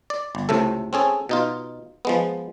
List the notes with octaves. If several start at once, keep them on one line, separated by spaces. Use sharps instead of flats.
D5
G1
C#2 A2 C3 A3 A4
C4 C#4 G#4 A4
B2 D#4 F4
F3 G#3 B3